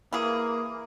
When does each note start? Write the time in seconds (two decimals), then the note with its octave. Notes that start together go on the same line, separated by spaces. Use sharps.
0.13 E3 A#3 G#4